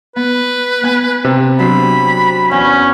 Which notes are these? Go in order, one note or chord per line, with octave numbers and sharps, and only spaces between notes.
B3 B4
B3 G#5 F#6
C3
F#3 D4 C5 B5
E2 C#4